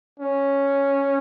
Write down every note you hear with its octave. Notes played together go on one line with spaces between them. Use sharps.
C#4